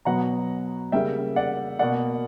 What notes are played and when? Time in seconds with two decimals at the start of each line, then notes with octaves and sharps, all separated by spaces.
0.05 B2 F#3 B3 F#5 A#5
0.92 C#3 G3 A#3 E5 G5
1.36 D5 F#5
1.79 B2 A#3 D5 F#5